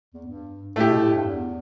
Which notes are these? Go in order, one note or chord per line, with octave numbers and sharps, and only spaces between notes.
E2
G2
A2 A3 E4 G4
B2
A2
G2
E2